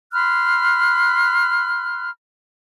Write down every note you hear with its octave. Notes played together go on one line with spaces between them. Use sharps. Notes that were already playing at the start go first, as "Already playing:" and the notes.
B5 C6 F6 F#6